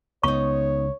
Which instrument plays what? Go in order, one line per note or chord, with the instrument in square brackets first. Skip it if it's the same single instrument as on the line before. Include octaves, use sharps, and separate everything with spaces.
[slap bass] C#2 [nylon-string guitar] B3 D#4 [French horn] C#5 [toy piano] C#6